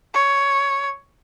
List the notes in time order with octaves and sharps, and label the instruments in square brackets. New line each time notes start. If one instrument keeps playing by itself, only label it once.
[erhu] C#5